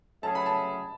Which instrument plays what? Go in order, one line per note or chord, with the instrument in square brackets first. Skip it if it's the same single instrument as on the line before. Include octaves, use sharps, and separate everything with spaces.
[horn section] F#3 A3 C#4 G#4 [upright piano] A5
[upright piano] B5
A5